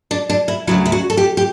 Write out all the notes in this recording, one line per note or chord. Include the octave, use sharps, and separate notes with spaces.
D4
D4
E4
D2 C#3 F#3 E4
E4
F#4
A4
G4
G4